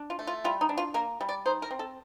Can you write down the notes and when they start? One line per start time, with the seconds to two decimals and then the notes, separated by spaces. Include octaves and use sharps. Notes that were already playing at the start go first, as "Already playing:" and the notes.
Already playing: D4
0.10 F4
0.19 A3
0.27 F4
0.44 G3 F4
0.61 D#4
0.69 D4
0.78 F4
0.94 A#3 A#4
1.21 G3
1.29 D5
1.46 D#4 C5
1.62 A#4
1.71 C4
1.79 A4